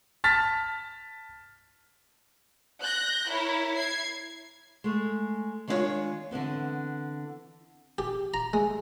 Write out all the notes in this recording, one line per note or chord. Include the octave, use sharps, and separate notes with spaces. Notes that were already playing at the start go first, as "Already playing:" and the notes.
A5 F6 A6 B6
F#6 G6 A#6
E4 A#4 C#5
G#6 C7
G#3 A3
D#3 G#3 D4 E4 F4 C#5
D3 E3 B3 C4
G4
A#5
G#3